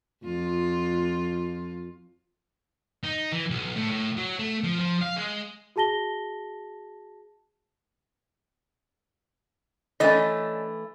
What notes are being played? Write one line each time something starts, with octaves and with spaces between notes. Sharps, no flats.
F2 F4
D#4
E3
B1
A2
A2
F#3
A3
F3
F3
F5
G#3
F#4 G#4 A5 A#6 G7
E3 A3 C#4 D4 D#5